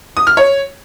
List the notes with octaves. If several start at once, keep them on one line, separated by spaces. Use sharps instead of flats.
D#6
F6
C#5